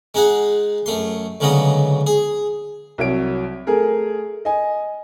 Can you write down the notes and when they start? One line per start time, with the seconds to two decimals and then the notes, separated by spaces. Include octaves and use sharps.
0.14 G#3 D#4 G#4 F#5
0.86 F#2 A3 C6
1.40 D2 G#2 C#3 F#3 B3 D#5
2.07 G#4
2.98 C2 F#3 C#5 D7
3.67 A3 G#4 A#4
4.45 D#5 G#5